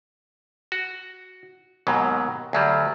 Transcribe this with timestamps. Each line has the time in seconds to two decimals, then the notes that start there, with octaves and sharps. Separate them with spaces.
0.72 F#4
1.87 D#2 G#2 B2 F#3
2.53 D2 F#3 G3